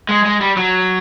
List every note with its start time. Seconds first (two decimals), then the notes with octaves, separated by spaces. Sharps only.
0.09 G#3
0.25 G#3
0.41 G3
0.57 F#3